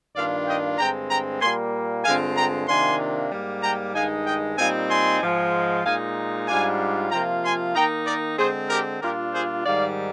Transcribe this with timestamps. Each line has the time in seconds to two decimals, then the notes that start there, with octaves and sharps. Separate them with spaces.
0.15 G2 D#3 A#3 D4 F4 D5 F5
0.47 D#5 G5
0.78 G2 D3 G#3 C4 G5 A#5
1.09 G5 A#5
1.41 A#2 G3 A#3 G#5 C6
2.05 G2 D3 G#3 C4 F4 F5 G#5
2.37 G5 A#5
2.68 C3 D#3 A#3 D4 F4 G#5 C6
3.31 G#2 G3 A#3
3.63 G5 A#5
3.95 G2 D#3 G#3 D#4 F5 G#5
4.26 D#5 G5
4.58 A#2 G3 C4 D#4 F5 G#5
4.90 G#5 C6
5.22 G#2 F3 G#3
5.85 A#2 G#3 D#4 F5 G#5
6.48 G#2 G3 D4 F4 F5 G#5
7.11 C3 F3 A#3 F4 G5 A#5
7.43 G#5 C6
7.75 D#3 A#3 D#4 G5 A#5
8.06 A#4 D5
8.38 D3 G#3 C4 G#4 C5
8.70 G4 A#4
9.01 A#2 G3 D4 F4 G4 A#4
9.33 G#4 C5
9.65 G#2 D#3 G3 D5 F5